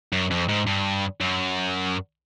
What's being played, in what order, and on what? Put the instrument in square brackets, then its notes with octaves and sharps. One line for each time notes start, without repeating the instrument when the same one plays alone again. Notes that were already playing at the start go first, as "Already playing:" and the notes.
[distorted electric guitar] F#2
F2
G#2
G2
F#2